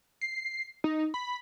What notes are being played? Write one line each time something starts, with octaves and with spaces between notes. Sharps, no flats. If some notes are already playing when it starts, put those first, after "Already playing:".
C7
D#4
B5